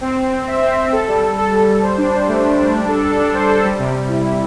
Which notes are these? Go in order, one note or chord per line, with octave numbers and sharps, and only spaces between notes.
C4
C4
C4
E5
C4
C4
A4
G3
G3
A4
G3
G3
C5
D4
C5
A3
A3
D4
G3
A4
A4
D4
C5
A4
G3
C3
C3
E4
E4